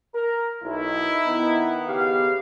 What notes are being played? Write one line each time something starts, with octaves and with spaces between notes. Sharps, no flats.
A#4
B1 D#4 E4
D#3 B3
C#3 G4 F5